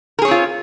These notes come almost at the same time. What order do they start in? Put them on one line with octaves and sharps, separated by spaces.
A#4 G#4 C#5 C4 F4